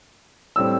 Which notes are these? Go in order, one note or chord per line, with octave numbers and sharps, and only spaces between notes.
A2 G3 C4 E6